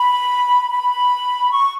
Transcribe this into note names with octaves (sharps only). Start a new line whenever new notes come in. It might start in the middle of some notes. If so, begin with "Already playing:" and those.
Already playing: B5
B5
C#6